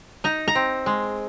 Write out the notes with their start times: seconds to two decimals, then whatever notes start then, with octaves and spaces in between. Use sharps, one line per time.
0.24 D#4 A#5
0.48 A#5
0.55 C4
0.86 G#3